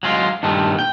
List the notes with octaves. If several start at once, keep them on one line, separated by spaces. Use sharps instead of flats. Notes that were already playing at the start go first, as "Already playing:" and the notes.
F#3 G#3 F4
G2 A#2 D#3 A3
G5